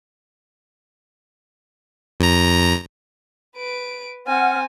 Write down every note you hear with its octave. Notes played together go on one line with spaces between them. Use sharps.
F2 A#5
B4 D7
C4 F#5 G#5 F6